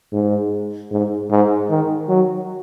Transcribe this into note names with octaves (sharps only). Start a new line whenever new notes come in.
G#2
G#2
G#2
D#3
F#3